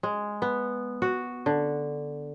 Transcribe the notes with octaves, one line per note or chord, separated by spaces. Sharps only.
G#3
B3
F#4
D3